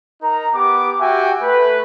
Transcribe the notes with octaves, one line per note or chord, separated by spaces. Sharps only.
D#4 A#4 A#5
B3 G4 D6
F#4 G4 E5 G5 G#5
A3 B4